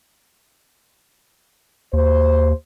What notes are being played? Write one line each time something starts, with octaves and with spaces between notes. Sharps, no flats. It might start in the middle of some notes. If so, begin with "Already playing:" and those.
D#2 C5